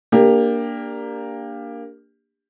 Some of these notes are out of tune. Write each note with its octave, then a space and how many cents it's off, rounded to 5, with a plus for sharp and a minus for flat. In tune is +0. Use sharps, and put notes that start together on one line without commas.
A#3 +0 D4 +0 G4 +20